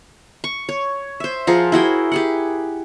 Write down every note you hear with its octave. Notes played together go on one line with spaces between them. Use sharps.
C#6
C#5
C5 E5
F3 G#4 A#4 F#5
E4 F#4 G#4 G5
G4 G#4 F#5